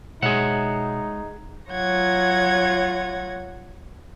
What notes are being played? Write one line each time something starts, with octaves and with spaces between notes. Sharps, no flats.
B2 G#3 D#4 G#4 C#5 E5 F#5
F#3 F4 C#5 F#5 G#6 A#6